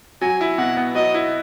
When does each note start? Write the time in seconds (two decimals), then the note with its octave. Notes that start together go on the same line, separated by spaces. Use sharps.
0.21 F#3 G#5
0.41 E4
0.58 B2 F#5
0.77 B3
0.95 F#3 D#5
1.14 E4